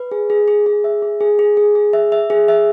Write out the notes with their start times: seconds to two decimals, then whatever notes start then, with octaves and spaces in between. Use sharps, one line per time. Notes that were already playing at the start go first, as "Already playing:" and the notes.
Already playing: B4
0.11 G#4
0.30 G#4
0.48 G#4
0.66 G#4
0.84 E5
1.02 G#4
1.21 G#4
1.39 G#4
1.57 G#4
1.75 G#4
1.93 E5
2.12 E5
2.30 G#4
2.48 E5